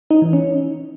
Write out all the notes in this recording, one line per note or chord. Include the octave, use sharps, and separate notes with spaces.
D#4
E3
C#4